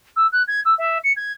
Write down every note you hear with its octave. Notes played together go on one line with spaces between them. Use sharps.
E6
F#6
G#6
E6
E5
C#7
G#6